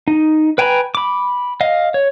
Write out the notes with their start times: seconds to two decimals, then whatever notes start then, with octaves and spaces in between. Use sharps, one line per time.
0.08 D#4
0.58 B4 G5 G#5 A#5 B5
0.95 B5 D6
1.61 D#5 F5
1.94 C#5